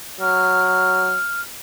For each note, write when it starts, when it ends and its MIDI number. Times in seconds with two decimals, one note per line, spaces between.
0.21 1.18 54
0.21 1.41 89